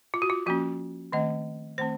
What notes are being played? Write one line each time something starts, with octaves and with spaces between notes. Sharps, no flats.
F4
F#4
F4
F3 A#3 C#4 F#4
D#3 A3 C4 D#5
D#3 A3 C4 C5